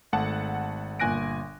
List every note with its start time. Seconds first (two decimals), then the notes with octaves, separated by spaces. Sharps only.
0.12 G#1 A3 F#5 A5
1.00 G1 A#2 G#5 F#6 A#6 D7